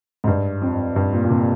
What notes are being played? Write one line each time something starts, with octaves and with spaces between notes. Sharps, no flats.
G#2
G2
F2
G2
A#2
A#2
C3